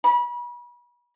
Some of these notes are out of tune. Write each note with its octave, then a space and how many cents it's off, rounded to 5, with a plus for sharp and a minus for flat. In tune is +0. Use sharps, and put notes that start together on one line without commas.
B5 -35